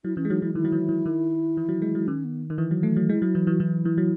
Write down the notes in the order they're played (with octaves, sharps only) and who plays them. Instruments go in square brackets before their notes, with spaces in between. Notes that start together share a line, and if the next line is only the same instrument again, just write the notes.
[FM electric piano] F#3 [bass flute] E4
[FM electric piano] E3 [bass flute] C#4
[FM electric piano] G#3
[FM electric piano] F#3 [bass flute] D#4
[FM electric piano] F#3 [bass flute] E4
[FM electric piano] D#3 [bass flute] E4
[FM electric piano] F#3
E3
E3
D#3
E3
F#3
G#3
F#3
[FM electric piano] D#3 [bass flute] C#4
[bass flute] B3
[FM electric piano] D#3
E3
F#3
A3
F#3
[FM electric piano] G#3 [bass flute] E4
[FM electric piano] F#3
E3
[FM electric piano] E3 [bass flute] F#4
[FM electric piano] E3 [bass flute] E4
[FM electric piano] E3
F#3